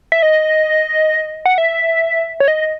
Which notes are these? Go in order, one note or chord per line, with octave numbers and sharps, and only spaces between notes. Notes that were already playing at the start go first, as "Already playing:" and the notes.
E5
D#5
F#5
E5
C#5
D#5